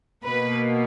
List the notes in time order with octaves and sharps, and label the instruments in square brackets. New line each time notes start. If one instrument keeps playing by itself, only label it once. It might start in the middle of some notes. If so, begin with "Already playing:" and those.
[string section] B2 A#3 B4